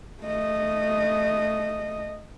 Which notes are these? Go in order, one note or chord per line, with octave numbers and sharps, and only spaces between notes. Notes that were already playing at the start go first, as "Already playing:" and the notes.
A3 D#5